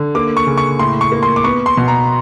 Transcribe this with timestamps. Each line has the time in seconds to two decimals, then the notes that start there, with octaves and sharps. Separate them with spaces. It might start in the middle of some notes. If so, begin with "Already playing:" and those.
Already playing: D3
0.15 A#3 D6
0.37 C#6
0.47 C#3
0.58 C#6
0.79 A2 C6
1.01 C#6
1.12 A#3
1.23 C6
1.36 D6
1.44 B3 C#6
1.66 C6
1.77 B2
1.88 A#5